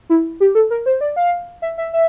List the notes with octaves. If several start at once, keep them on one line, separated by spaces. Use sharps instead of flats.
E4
G4
A4
A#4
C5
D5
F5
E5
E5
E5